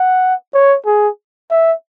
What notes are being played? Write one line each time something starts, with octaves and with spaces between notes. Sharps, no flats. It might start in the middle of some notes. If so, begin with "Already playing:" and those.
Already playing: F#5
C#5
G#4
E5